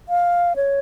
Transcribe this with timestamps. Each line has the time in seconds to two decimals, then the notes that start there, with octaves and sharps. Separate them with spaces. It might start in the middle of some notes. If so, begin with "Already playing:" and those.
0.09 F5
0.56 C#5